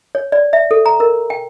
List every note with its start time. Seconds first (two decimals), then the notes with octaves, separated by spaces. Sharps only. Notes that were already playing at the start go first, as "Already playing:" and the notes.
0.15 C#5
0.32 D5
0.53 E5
0.71 A4
0.86 A#5
1.00 A#4
1.30 G5